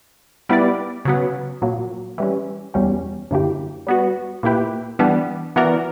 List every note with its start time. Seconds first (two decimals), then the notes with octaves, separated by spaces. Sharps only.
0.49 G3 B3 E4 B4 D5
1.05 C#3 F#3 B3
1.62 A#2 F#3 A#3
2.18 E3 G3 C#4
2.74 E2 B2 G3 C#4 G4
3.31 F#2 D3 A#3 E4 G4
3.87 G3 B3 F#4
4.43 A#2 A#3 E4 G4 B4
4.99 E3 G3 B3 D4
5.56 E3 B3 F#4 A#4 D5